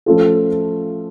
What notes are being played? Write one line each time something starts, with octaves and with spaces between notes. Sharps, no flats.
F3 A3 C#4 F4 A4